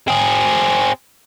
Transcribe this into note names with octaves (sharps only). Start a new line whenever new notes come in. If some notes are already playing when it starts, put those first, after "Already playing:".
C4 G#4